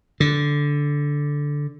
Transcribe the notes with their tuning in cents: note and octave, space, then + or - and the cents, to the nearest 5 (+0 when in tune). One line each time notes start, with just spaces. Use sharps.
D3 -5